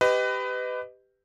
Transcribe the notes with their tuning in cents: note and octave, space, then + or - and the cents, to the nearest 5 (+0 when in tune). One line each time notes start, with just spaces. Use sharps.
G4 +0 B4 +25 D#5 +0